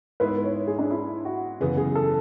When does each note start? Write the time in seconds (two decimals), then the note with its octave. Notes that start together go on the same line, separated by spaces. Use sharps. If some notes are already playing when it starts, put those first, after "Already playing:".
0.20 G#2 G#3 B3 E4 B4
0.44 C#5
0.67 G#4
0.79 D4
0.91 E4
1.25 F#4
1.60 F#2 C#3 E3 B3 G#4
1.77 G#4
1.95 A4